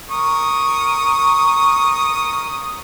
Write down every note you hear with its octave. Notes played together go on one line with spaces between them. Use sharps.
A#4 C#6 D#6